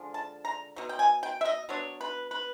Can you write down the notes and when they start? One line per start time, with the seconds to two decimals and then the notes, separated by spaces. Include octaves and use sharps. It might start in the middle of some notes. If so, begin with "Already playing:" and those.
Already playing: D3 F3 G#3
0.14 A5
0.45 A#5
0.76 B2 F#3
0.89 G5
0.99 G#5
1.23 G5
1.41 E5
1.45 D#5
1.69 F#3 B3 D4 C#5
2.01 B4
2.31 B4